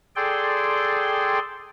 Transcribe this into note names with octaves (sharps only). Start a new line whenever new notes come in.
G#4 A4 D5 G5 C6